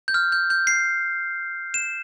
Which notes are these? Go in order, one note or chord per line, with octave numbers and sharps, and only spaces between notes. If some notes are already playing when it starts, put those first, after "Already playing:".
G6
F6
G6
G6
C7
E7